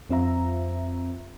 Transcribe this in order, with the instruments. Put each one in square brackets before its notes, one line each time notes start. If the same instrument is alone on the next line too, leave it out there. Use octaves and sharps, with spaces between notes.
[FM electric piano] F2 C4 F4 E5 A#5